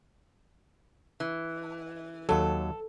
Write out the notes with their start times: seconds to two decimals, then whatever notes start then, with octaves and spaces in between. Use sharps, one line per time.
1.20 E3
2.29 D#2 F#3 A4